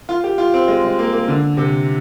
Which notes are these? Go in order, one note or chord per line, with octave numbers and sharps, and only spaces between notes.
F4
G4
F4
C4
G#3
G#3
A#3
A#3
D3
C3